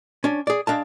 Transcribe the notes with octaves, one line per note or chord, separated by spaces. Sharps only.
C#4 D4
G#4 D5
G#3 D4 F5 A5